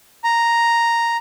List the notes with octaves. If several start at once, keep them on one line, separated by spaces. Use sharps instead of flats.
A#5